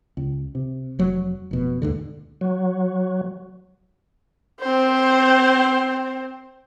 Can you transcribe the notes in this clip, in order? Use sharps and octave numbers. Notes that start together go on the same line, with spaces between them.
C#2
C3
F1 F#3
F1 B2
D#2 G#2 D3
F#3
C4 C5